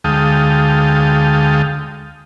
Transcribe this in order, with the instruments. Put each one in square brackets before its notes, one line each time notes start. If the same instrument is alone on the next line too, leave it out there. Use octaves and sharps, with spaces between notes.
[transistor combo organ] D2 G#3 F5 G5 A5 D#6